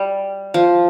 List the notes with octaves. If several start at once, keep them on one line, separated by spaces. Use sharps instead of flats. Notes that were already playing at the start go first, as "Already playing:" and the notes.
Already playing: G3
F3